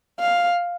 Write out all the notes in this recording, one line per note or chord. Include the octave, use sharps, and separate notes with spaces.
F5